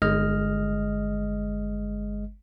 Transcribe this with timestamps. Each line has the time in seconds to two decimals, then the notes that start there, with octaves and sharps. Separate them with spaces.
0.02 G1 G#3 D#5 F6